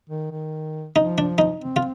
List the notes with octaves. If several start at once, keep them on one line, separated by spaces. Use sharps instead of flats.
D#3
D#3
F3 D#4
D4
D#4
C4
F4